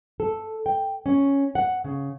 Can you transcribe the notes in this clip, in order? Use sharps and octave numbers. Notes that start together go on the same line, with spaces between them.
A4
G5
C#4
F#5
C#3